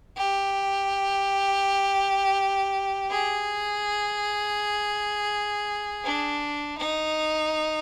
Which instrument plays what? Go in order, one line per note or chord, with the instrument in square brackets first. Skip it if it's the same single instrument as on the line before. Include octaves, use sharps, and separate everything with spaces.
[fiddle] G4
G#4
D4
D#4